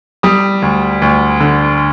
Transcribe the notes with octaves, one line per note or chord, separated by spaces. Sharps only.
G3 D#6
D2
D2
D3